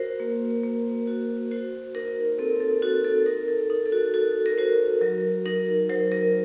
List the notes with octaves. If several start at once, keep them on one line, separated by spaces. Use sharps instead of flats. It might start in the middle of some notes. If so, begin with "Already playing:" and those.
Already playing: F#4 A#4 C5
A#3
A#3
F#4
F#4 C5
D#4 A#4
C4 A4
A4
D#4 F#4
A4
D#4 A#4
A4
D#4
A4
F#4
F#4 A4
A#4
F#4 C5
F#3 A#4
D#4 A#4
F#3 C5
A#4